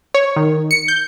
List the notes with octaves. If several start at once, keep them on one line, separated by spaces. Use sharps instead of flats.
C#5
D#3
C#7
G6